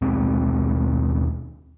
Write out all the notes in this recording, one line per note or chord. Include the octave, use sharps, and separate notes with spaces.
D#2 B2 G#3 C4